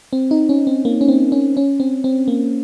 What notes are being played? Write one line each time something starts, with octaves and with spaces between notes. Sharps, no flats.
C4
D#4
C#4
C4
A#3
C#4
C4
C#4
C#4
C4
C4
A#3